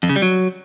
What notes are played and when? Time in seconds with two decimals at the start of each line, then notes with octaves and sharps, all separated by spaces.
0.03 F2
0.09 C#3
0.16 G3
0.22 F#3